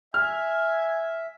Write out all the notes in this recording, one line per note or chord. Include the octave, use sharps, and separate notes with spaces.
E5 G#5 F6